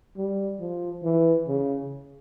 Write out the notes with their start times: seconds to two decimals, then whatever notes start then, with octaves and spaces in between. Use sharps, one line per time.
0.17 G3
0.60 F3
1.04 E3
1.47 C#3